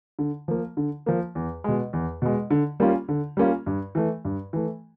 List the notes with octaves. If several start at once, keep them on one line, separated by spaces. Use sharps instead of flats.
D3
F3 A#3
D3
F3 A#3
E2
B2 G#3
E2
B2 G#3
D3
G3 A#3 C#4 F4
D3
G3 A#3 C#4 F4
G2
E3 A3
G2
E3 A3